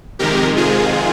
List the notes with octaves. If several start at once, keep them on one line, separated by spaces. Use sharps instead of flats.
F2 C3 D#3 G#3 G4 A#4
F4 G#4